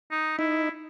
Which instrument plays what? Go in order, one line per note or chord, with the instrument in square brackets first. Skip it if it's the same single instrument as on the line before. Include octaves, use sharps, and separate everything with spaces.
[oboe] D#4
[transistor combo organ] D#4 [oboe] E4